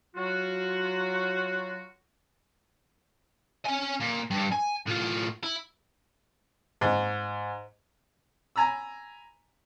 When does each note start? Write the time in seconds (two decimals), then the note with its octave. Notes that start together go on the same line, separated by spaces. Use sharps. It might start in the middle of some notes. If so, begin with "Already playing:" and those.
0.16 F#3 F4 F#4
3.65 C#4 G#5
4.00 A#2
4.31 G2
4.52 G#5
4.87 A2 F4
5.43 E4
6.81 G#2
8.56 G#5 A#5 B5 E6